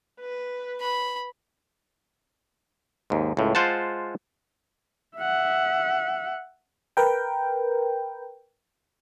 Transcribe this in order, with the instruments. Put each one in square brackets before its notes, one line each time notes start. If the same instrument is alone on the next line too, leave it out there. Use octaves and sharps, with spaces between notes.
[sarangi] B4
[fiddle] B5
[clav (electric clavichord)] D#2 G#2
C#2 A2
G#3 F4 C5 F#5 A5
[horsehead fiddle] E5 F#5
[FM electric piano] A#4 B4 G5